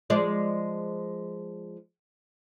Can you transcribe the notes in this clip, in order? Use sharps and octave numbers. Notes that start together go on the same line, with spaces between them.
F3 G#3 D5